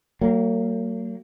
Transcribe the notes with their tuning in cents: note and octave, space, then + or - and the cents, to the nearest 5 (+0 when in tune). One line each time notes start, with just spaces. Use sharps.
F#3 +30 A#3 -35